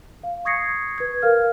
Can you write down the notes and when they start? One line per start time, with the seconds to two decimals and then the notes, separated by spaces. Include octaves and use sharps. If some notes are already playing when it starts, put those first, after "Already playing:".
0.23 F5
0.45 C#6 D#6 G#6 A#6 C7 C#7
0.98 B4 G#6
1.22 A#4 F5 F6